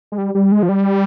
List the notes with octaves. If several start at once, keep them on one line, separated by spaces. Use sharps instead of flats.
G#3
G3
G3
G#3
F3
G3